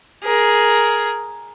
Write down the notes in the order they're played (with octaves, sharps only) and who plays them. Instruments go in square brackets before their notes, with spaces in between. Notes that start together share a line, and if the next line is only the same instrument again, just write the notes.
[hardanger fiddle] G#4 A#4